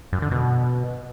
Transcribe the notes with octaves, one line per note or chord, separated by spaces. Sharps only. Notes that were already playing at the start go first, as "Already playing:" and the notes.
F#2
D3
B2